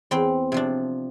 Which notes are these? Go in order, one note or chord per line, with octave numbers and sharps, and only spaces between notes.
E2 C4
C3 F3 D4